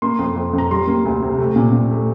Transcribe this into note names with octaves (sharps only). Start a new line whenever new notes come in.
A#3 C6
F2
F2
F2
A#5
G3 C6
A#3
D2
C3
A3
A#2
A#2
A3